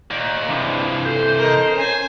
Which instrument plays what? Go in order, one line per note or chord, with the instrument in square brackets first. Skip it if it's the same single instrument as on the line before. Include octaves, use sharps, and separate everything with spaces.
[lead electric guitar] D#2 [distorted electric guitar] A#4 D5
[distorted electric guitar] C3 E3 [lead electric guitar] F3 G#3 [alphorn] D4
[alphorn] A4 [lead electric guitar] C5
[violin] A#4 D#5
[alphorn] C#4 [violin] G#5